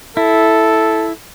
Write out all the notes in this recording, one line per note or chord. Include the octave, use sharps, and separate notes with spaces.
E4 A4